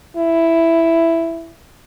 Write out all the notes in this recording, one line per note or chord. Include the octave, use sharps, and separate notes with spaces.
E4